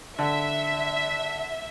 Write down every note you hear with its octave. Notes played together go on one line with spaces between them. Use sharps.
D3 E5